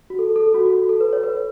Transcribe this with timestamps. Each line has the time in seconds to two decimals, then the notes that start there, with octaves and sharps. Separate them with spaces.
0.10 F#4
0.19 A4
0.36 A4
0.54 F#4
0.66 F#4
0.89 A4
1.01 B4
1.13 C#5
1.24 B4